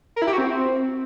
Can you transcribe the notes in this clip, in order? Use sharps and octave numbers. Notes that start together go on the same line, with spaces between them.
A#4
E4
G4
F#4
C4